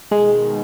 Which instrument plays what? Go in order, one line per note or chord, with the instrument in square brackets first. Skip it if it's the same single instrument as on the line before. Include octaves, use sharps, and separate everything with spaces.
[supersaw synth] B2 D#3 [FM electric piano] G#3